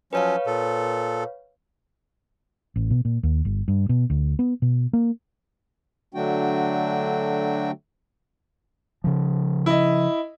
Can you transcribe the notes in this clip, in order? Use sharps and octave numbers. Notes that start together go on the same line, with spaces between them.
F3 F#3 C#4 B4 C#5 F5
A#2 A4
A1
B2
A#2
D#2
G1
G2
B2
D2
B3
B2
A#3
D3 F#3 A3 D4 F#4 G5
C#3 F3
E4 D#5